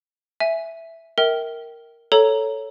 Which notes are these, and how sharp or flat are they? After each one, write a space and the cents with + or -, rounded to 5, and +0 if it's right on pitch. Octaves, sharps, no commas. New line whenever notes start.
E5 +0 G#5 +0
A#4 +0 E5 -30 G5 -15
A4 +0 C#5 +5 A#5 +0